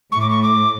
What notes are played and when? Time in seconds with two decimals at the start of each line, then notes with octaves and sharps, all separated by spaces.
0.12 A2 C#6
0.21 D6
0.30 C#6
0.42 D6